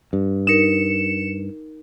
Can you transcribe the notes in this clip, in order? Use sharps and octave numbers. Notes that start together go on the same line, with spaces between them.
G2
D#4 A#4 C#7 E7